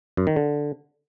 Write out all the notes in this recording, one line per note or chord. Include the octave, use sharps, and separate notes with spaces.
F#2
D#3
D3